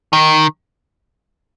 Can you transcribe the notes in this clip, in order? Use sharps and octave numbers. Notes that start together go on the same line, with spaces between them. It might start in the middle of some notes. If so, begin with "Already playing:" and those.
D#3